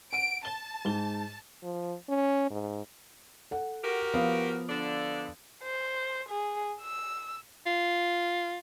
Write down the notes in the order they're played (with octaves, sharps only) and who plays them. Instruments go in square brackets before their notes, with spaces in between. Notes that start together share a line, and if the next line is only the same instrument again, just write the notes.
[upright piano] F#5 D#7 [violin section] D7
[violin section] A5 [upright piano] G7
[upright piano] G#2 G7
[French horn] F3
C#4
G#2
[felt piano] A4 F#5
[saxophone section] F#4 G4 A#4
[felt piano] F3 B3 F5
[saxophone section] D3 D4
[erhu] C5
G#4
E6
[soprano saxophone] F4